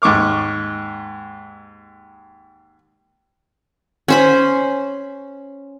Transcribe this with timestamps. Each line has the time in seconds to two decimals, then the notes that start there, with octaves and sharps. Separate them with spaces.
0.02 D#2 G#2 C#6 D6 F6
4.08 C#4 C5 B5